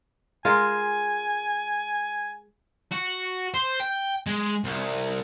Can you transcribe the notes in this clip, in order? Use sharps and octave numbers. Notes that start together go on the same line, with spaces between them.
G#3 F4 A#4 G#5
F#4
C5
G5
G#3
C2